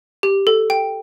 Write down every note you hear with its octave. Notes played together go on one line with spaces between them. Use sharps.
G4
A4
G5